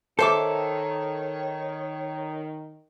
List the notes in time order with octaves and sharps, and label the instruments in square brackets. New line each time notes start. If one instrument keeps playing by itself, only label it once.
[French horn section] D#3 [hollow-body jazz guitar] A4 [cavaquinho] C5 E5 D6 [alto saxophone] C#5